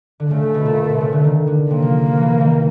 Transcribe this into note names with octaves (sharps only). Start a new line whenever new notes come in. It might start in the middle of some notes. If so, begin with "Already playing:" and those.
D3
C#3 A3
C#3
B2
A#2
B2
C3
C#3
D3
D#3
D3
C3 A#3
F3
F3
E3
D#3